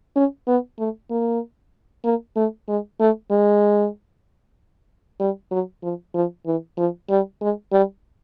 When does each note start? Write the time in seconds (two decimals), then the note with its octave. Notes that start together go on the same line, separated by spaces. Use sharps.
0.16 C#4
0.47 B3
0.79 A3
1.11 A#3
2.04 A#3
2.36 A3
2.68 G#3
3.00 A3
3.31 G#3
5.20 G3
5.51 F#3
5.83 F3
6.15 F3
6.46 E3
6.78 F3
7.10 G3
7.42 G#3
7.72 G3